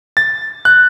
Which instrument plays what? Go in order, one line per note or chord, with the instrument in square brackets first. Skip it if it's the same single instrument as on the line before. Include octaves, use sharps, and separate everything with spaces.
[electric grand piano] A6
F#6